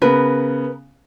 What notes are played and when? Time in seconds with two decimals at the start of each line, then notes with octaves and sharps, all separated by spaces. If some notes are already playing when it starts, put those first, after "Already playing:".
0.02 C#3 B3 A#4 B4